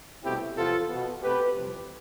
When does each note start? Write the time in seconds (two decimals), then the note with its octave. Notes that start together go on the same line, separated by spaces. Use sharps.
0.23 C2 B2 A3 C4 E4 G4
0.56 E2 C3 F3 B3 F4 A4
0.89 B2 B3
1.22 B2 A3 C4 G4 B4
1.55 F2 C3 E3 G3 C4